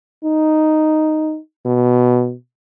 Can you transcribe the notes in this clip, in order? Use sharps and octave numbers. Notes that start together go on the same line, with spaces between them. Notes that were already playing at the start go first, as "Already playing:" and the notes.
D#4
B2